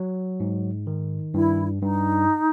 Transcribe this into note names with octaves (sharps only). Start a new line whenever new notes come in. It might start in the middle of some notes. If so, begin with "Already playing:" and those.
Already playing: F#3
G#2
D#3
G2 E4
G2 D#4